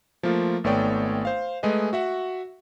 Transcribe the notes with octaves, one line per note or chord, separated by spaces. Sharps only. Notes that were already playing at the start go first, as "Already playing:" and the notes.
F3 A3 A#3 F4
G#1 A3 B3 C#5 D5 G5
C5 F5
G#3 A3 G#4 B4 D#5
F#4 E5 F#5